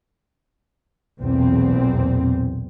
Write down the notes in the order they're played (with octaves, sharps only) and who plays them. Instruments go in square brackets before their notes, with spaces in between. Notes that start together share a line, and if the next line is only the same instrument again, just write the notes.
[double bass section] B1 E2 A#2 C4